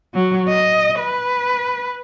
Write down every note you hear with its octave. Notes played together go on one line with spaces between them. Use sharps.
F#3
D#5
B4